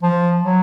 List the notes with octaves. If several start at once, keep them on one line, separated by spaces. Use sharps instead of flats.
F3
F#3